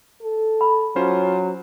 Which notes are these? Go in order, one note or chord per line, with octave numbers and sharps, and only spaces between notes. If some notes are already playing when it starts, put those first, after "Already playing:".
A4
B5
F#3 C#4 F4 C5